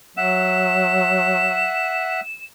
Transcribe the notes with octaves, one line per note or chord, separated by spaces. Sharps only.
F#3 E5 F#5 E7